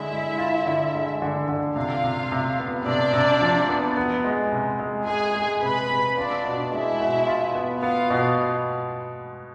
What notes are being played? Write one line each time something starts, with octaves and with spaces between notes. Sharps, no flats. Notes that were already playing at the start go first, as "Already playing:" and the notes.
Already playing: D3 G#3 E4 E5
G#3
F4
D3
G#3
D3
D3
C3 F4 F5
C3
C3
B3
C3 D4 D5
C3
F3
B3
B3
G#3
C3
G#3
G#3 G#4 G#5
G#3
C3 B4 B5
C3
D4 F4 D5
B2
G#3 E4 E5
B2
F4
B3
B3 F4 F5
B2